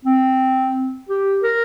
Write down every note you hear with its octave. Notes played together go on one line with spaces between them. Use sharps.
C4
G4
A#4